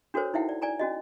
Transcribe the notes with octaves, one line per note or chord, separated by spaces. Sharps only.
D4 F#4 A4 A#4 C5 C#5
D#4 E4 E5 F#5 G5
D5
D5 G#5 A#5
C#4 F#4 D#5